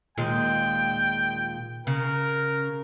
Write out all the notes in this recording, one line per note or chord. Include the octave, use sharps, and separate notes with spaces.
D#2 A#2 G#3 G5
C#3 A#4